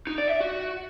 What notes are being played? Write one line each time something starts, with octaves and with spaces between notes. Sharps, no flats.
D#4
D5
E5
F#4